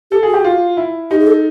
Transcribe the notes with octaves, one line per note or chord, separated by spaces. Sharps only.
G4 A4
F#4 G#4
G4
F4
E4
D#4 G4
G#4
A4